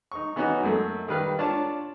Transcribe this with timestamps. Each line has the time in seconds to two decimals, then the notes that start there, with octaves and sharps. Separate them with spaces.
0.12 D#4 C#6
0.36 E3 B3 C#4 D#4 F#4
0.63 F#2 A3
1.08 D#3 G3 B4 F5
1.39 D4 F4 C#5 A5